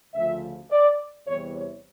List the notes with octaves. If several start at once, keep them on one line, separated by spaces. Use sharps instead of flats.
D2 C#3 F3 E5
D5
E2 C3 E3 G3 C#5
C#5